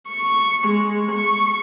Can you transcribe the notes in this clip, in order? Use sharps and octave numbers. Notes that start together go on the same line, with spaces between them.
C#6
G#3
C#6